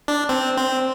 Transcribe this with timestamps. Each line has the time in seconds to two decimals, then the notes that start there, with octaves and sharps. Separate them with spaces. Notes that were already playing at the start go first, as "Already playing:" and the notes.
0.08 D4
0.29 C4
0.58 C4